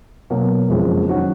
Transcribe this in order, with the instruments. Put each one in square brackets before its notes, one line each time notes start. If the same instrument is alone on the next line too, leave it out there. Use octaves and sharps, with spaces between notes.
[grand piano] B2 F#3 A#3
F#1 F2 F3 G#3 C#4
D#3 F#3 C#4 F#4